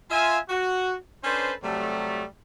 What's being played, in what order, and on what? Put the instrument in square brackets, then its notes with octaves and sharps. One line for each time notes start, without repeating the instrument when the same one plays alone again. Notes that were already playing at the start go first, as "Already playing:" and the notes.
[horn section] F4 E5 G#5
F#4
C#4 D4 A4 B4 C5
C3 F#3 G3 A3